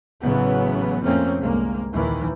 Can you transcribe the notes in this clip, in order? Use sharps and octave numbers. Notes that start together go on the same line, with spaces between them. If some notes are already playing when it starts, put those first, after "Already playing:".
A1 C#3 E3 F#3 B3
F2 A2 A3 A#3 C4 C#4
G1 C2 G#3 A#3
A#1 D#2 D#3 E3